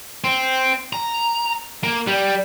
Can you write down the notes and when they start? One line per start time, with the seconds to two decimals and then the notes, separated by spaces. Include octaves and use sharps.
0.24 C4
0.93 A#5
1.83 A#3
2.07 G3